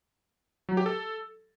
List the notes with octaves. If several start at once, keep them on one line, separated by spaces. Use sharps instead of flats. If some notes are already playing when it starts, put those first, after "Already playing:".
F#3
G4
A4